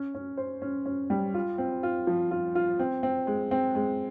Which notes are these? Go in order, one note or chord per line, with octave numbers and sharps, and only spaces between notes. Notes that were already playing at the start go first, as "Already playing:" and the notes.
Already playing: C#4
C#4
C5
C#4
C#4
G3
F4
C4
F4
F3
F4
F4
C4
C4
G#3
C4
G#3